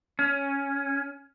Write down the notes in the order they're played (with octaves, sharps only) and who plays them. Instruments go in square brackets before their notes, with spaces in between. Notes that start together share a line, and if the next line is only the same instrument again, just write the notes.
[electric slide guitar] C#4